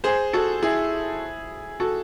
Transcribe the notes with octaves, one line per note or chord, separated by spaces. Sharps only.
G#4 C5
F#4 A4
E4 G#4
F#4 A4